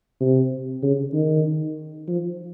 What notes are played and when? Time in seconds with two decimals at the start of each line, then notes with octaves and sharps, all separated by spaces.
0.20 C3
0.83 C#3
1.13 D#3
2.08 F3